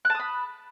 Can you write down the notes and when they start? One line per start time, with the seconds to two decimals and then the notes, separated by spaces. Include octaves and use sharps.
0.05 F#6
0.10 A5
0.15 D#6
0.20 B5